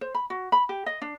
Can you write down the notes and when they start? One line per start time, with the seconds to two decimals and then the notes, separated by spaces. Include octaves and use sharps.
0.01 C5
0.15 B5
0.30 F#4
0.52 B5
0.69 G4
0.86 D#5
1.02 D4